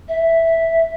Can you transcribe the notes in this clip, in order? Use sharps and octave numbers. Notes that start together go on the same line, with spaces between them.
E5